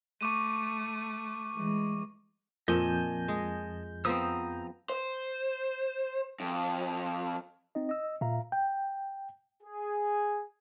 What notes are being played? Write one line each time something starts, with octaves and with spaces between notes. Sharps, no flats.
A3 C#6 D6 D#7
E3 G#3
F2 A#2 D#5 G#5 A5 G6
G#3
F3 B3 C4 A#5 D#6 E6
C5
F2
C4 D#4 D#5
D#5 E6
A#2 E5 F5 A#5
G5
G#4